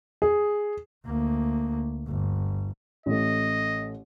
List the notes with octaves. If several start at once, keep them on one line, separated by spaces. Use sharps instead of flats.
G#4
D2 A#3
G1
A1 A3 D#5